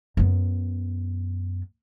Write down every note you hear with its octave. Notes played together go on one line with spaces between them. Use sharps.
F#2 B3